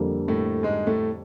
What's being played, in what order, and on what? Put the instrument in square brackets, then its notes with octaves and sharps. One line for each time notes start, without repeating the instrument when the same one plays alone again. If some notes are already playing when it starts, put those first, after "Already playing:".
Already playing: [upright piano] F2 D3 G3 A#3
[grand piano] A2 A3
G#2 G#3
A2 A3